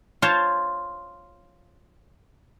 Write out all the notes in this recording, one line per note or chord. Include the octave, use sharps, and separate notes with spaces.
F4 C5 C#5 A5